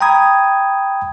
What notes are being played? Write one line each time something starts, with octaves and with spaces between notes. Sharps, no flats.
G5 A#5 B5 D#6 G#6